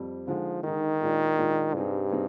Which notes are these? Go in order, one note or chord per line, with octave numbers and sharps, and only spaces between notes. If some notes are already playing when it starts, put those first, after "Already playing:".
Already playing: F2 G3 C4
D3 F3 G#3 D#4
D3 D#3 G#3 D#4
A#2 G#3 D4 F4
A#2 G#3 D4 F4
G2 C3 G3 C4 D#4 G#4
C3 G3 C4 D#4 G#4